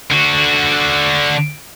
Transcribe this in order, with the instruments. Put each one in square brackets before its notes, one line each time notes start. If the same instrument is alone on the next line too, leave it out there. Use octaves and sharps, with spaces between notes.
[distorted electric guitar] D3 F#4